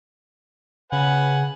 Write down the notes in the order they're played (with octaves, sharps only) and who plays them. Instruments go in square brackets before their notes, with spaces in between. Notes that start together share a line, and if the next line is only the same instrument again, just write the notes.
[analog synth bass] C#3 [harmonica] B4 F#5 G#5